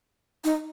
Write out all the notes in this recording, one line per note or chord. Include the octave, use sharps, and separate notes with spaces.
D#4